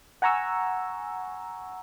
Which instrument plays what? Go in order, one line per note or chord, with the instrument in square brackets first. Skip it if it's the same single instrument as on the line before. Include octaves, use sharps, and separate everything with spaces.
[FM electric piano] F#5 G#5 A#5 C#6 E6